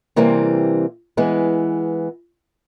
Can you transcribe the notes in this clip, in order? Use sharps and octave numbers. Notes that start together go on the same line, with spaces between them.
C3 E3 G3 A#3 C4
E3 G#3 B3